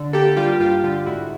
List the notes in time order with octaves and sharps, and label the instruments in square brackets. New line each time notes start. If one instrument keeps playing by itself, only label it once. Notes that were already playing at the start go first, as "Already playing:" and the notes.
Already playing: [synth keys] D3
A#3 G4 A4
G3 F4 G4
G2 F4 G4
D3 F4 G4
G#2 E4 F#4